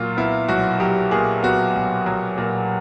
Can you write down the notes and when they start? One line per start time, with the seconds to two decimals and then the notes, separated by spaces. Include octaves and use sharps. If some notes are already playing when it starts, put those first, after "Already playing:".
Already playing: A#2 F#3 F4
0.17 B3 E4
0.48 B1 F#4
0.80 F#3 G4
1.11 A#2 G#4
1.43 B3 F#4
1.75 B1
2.06 F#3
2.38 A#2